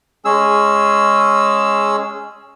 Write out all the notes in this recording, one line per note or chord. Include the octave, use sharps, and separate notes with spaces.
G#3 C#4 G#4 E6